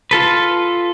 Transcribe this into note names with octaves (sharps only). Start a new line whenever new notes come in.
F4 A4 B4